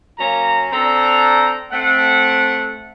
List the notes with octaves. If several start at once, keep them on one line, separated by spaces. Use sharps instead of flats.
F#3 A#3 C#4 A#5
C4 D4 A4 A#5
A3 C4 F#5